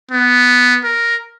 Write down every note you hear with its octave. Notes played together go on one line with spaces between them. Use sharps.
B3
A#4